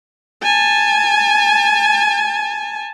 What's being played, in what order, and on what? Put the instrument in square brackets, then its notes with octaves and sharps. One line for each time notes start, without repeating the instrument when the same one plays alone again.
[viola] G#5 A5